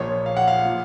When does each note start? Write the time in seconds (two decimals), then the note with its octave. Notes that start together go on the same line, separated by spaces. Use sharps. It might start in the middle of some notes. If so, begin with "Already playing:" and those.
Already playing: A#1 A#2 F3 C#5
0.26 F5
0.37 F#5
0.47 F5
0.65 A#2 F3